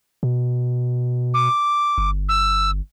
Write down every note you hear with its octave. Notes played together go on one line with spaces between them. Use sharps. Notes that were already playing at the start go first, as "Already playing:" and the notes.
B2
D6
G1
E6